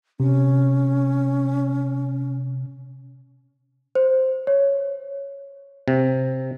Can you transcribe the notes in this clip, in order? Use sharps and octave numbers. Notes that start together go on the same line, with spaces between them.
C3 C#4
C5
C#5
C3